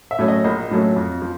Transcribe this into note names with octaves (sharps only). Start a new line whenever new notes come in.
E5
A2 F#3 A3 C#4
D#5
A#1 D#5
A2 F#3 A3 C#4
F2
F3